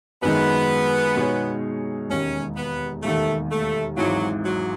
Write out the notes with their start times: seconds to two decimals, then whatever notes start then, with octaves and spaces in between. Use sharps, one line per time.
0.22 F#2 D#3 G#3 B3 D#4
1.16 B2 G#3 D#4 G#4 C#5
2.09 E1 D#2 D#3 C#4
2.56 B3
3.03 E1 D#2 D#3 A3
3.51 A3
3.97 G#1 G#2 E3 F#3
4.44 F#3